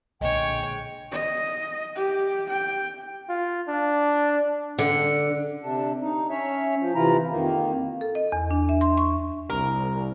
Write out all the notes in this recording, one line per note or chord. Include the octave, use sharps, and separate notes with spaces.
B1 A#2 D3 G#3 C#5 G5
D#5
G4
G5
F4
D4
D3
C3 D4
D#4
C#4 C#5 E5
F3
C3 E3 E4 F4 A#5
F2 D#3 A#3
A4
D#5
E2
D4
E5
C6
C#6
C2 A#4